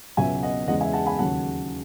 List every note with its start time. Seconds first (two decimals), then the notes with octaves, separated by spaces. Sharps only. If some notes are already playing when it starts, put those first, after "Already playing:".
0.17 C#2 B2 F#3 E5 G#5
0.43 D#5 F#5
0.68 E2 C#3 G#3 D#5 F#5
0.81 E5 G#5
0.93 F#5 A5
1.06 G#5 B5
1.18 D#2 C#3 F#3 F#5 A5